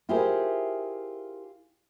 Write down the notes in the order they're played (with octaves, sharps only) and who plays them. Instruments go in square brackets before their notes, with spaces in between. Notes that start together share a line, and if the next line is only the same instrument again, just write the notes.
[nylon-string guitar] E4 F4 G4 G#4 A#4 C5